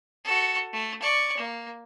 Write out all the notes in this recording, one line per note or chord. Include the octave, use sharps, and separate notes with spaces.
F#4 A4
A3
D5 C#6
A#3